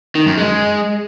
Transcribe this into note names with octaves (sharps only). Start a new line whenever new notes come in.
D#3
F#2
G#3